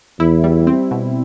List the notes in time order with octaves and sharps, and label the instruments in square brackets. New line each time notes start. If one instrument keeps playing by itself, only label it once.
[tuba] E2 [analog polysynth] E4
[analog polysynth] G3
C4
B2